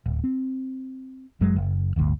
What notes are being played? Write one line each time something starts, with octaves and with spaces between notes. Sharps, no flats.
D1
C4
F#1 F#2 F#3 G#3
F#1
D1 G1 D2